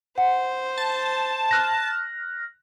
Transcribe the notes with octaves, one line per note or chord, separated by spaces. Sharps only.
C5 F#5
A5
F6 F#6 A#6